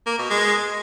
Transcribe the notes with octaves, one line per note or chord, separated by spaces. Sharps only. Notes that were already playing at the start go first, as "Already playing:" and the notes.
A#3
B2
G#3